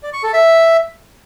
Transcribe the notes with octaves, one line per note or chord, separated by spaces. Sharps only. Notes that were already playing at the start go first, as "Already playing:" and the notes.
D5
C#6
A4
E5